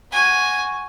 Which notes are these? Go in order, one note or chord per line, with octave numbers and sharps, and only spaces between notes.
F#4 G#5